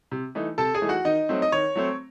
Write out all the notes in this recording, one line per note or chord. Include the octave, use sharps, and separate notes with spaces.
C3
E3 A3 D#4
C3 A4 A5
G#4 G#5
E3 A3 D#4
F#4 F#5
D#3 D#4 D#5
F#3 A3 C4
D#5
D#3 C#5
F#3 A3 C4